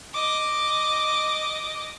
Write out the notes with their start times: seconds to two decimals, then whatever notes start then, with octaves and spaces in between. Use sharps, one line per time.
0.13 D#5 D6